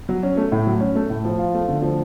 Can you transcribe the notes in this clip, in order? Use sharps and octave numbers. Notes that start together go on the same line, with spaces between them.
F#3
C#4
A3
A2
F#3
C#4
A3
A2
F3
F4
A3
D3
F3